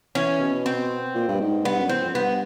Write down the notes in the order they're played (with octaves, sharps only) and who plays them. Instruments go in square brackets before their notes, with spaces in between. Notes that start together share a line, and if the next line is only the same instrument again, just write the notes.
[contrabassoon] E3 [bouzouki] C#4
[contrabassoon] B2
[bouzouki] C4
[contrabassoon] A#2
G2
G#2
[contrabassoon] G2 [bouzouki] B3
[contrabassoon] F#2
[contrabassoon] E2 [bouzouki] C4
[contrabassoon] F2
[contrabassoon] G2 [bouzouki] B3